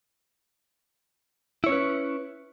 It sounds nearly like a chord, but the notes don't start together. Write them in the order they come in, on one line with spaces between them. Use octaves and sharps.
E4 C#5 C#4 B4